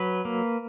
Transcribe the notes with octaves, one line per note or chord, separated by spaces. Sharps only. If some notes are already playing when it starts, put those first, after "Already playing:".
Already playing: F#3 B4
A#3